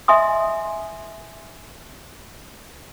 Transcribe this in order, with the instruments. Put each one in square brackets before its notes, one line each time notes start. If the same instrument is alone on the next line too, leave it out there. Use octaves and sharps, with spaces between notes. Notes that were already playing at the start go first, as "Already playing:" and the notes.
[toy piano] D#5 E5 G#5 C6 D#6